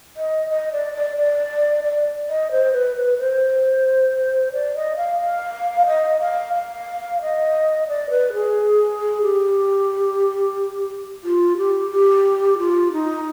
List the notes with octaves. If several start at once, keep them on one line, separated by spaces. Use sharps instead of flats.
D#5
D#5
D5
D5
D5
D5
D#5
C5
B4
B4
C5
D5
D#5
F5
F5
D#5
F5
F5
D#5
D5
B4
G#4
G4
F4
G4
G4
F4
D#4